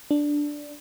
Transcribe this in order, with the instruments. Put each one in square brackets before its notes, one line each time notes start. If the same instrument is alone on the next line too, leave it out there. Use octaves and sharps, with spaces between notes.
[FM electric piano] D4